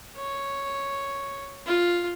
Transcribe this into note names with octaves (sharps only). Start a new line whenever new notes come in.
C#5
F4